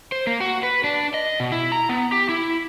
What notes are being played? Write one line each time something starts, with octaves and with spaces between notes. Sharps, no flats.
C5
A#3
F#4
B4
D4
D#5
B2
E4
A#5
B3
G4
E4